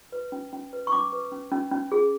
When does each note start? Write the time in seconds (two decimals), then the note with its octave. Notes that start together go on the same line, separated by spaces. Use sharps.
0.12 B4
0.32 C#4
0.53 C#4
0.73 B4
0.87 C#6
0.92 C#4 D6
1.13 B4
1.32 C#4
1.52 C#4
1.71 C#4
1.92 G#4